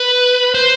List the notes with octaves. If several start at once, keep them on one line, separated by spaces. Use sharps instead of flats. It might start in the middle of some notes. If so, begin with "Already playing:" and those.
Already playing: B4
C5